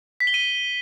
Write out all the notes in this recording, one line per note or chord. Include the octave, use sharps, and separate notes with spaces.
B6
G7
D#7